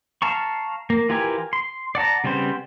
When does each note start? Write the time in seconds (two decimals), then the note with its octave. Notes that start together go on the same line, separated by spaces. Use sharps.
0.22 F5 A5 A#5 C#6
0.90 A#3
1.09 E3 F4 G4 A#4 G#5
1.53 C6
1.95 D5 F#5 A5 A#5
2.24 C#3 G3 B3 C4 C5